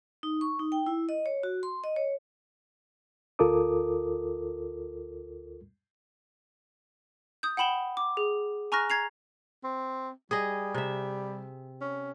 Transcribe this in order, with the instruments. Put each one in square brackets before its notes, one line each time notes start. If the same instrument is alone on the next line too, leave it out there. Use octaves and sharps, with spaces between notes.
[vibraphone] D#4
C#6
D#4
G5
E4
D#5
C#5
F#4
C6
D#5
C#5
[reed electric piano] D2 F4 A4 A#4 D6 D#6
[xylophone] D#6 G6
F#5 G5 B5 E7 G7
D6
G#4
G#5 A#5 C#6 F6 F#6 A#6
A#5 G#6 C7 F7
[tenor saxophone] C4
[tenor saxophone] G3 [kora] G#4 D#5
[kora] C3 E5
[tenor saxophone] C#4